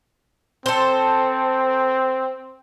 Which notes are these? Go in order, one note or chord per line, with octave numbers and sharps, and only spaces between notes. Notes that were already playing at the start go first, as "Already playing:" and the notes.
C4 A4 C5